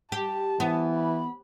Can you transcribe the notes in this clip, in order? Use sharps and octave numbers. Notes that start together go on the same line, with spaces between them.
G4 A5
E3 B3
B5